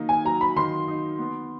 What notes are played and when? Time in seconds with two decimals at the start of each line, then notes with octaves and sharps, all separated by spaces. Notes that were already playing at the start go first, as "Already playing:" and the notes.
Already playing: D#3 F#3 A#3 D#4
0.09 G#5
0.25 F#3 A#5
0.41 B5
0.56 D#3 C6
0.88 D#4
1.19 B3